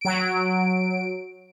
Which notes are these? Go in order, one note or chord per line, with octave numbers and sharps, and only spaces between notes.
F#3 D7